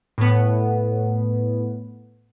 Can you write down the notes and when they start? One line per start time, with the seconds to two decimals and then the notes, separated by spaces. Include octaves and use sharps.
0.18 A2 B3